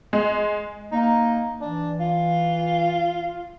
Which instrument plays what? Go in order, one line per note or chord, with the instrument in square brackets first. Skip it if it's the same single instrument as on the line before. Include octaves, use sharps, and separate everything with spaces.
[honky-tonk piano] G#3
[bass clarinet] A#3 [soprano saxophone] D#4
[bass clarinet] E3 [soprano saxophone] D4
[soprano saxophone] F4